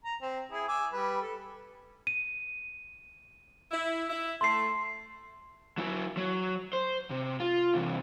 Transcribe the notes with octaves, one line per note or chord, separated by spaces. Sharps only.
A#5
C4
E4 G#4
G#5 D6 E6
G3 B4
A4
D#7
E4
E4
A3 C6 C7
F#3 E4
F#3
C5
C3
F4
C3 E3